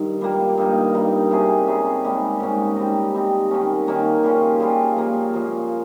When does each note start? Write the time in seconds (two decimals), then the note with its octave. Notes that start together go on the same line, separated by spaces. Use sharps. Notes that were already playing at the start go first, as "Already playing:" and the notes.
Already playing: G2 D#3
0.21 A#2 G3 A#3
0.57 G2 G3 A#3 D#4
0.94 G2 G3 A#3 D#4
1.31 C3 G3 C#4 G#4
1.67 C3 G3 C#4 G#4
2.04 G#2 G3 A#3 C#4
2.40 G#2 G3 A#3 C#4
2.76 G3 C4 D#4
3.14 G3 C4 D#4
3.51 D#3 A#3 C#4
3.87 D#3 A#3 C#4
4.23 C#3 G3 C#4 F4
4.60 C#3 G3 C#4 F4
4.96 A#2 F3 A#3
5.34 A#2 F3 A#3